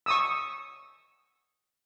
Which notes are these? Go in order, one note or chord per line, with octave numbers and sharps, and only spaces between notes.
C#6 D#6 E6